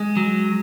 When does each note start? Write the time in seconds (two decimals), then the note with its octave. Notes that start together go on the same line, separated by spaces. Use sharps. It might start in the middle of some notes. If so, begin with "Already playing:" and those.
Already playing: G#3
0.17 F#3